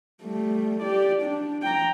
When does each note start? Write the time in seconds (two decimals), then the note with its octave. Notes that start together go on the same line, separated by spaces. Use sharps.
0.23 G3 A3
0.83 G4 D5
1.22 D4
1.62 G5 A#5